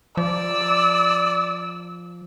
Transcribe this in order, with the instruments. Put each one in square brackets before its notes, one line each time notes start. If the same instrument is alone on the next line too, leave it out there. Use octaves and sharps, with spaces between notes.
[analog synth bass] F3 [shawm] D5 [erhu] E6